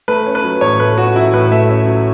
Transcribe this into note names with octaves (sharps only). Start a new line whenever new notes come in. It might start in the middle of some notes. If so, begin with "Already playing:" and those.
A3 B4
C#4
B4
F#3
A2 C#5
A3 B4
C#4 F#4
F#3 E4
A2 B4
A3 E5
C#4 E5
F#3